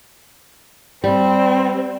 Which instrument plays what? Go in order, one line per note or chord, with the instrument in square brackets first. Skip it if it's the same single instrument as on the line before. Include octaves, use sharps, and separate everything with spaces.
[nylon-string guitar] G3 [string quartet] C4